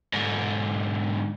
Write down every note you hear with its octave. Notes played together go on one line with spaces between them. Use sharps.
G#2 D3